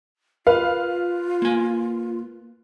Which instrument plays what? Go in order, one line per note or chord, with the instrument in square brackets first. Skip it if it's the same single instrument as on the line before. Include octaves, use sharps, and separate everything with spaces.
[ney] F4 [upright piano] B4 [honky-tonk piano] F5
[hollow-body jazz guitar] A#3 G#5